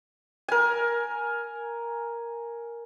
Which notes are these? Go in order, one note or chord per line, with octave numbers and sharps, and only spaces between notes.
A#4 G#5